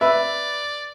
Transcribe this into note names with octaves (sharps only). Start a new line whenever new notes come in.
B4 D5 E5